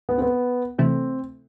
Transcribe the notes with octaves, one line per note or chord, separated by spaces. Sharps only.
B3
C4
B3
C3 E3 A3 C4 E4